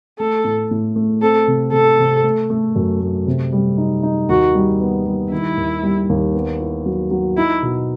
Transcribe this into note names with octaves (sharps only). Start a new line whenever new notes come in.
A3 A4
A2
A2
A3
C4 A4
C3
C3 A4
C3
A3
A3
F#2
A3
C3
G3
D#4
D#4
D#2 F#4
G3
B3
G3
D#3 E4
D#2
G3
D#2
B3
E4
F#3
F#3
D#4 E4
B2